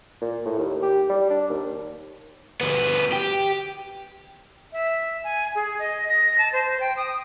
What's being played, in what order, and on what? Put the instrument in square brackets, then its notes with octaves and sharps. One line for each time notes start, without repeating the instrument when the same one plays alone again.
[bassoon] A#2
A2
D#2
G4
G3
D4
D#2
[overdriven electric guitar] D2 B3
G4
[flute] E5
G#5
G#4
D#5
A#6
A5
C5
G5
D#6